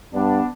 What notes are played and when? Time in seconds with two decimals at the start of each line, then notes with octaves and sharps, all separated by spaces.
0.14 G2 B3 D4